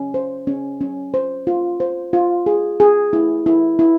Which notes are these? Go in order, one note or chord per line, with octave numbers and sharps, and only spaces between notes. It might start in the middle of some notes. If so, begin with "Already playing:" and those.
Already playing: C#4
C5
C#4
C#4
C5
F4
C5
F4
G#4
G#4
E4
E4
E4